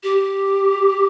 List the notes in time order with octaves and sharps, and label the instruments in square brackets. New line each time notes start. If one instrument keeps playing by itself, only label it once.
[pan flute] G4